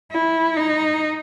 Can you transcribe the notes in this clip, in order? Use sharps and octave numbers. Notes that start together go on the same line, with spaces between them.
E4
D#4